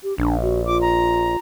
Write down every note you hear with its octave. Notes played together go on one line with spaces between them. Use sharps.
G4
A#1 D4
F#4
F4 D6
A#5